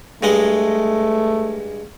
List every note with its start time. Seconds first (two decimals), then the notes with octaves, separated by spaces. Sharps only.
0.23 G2 G#3 A3 D#5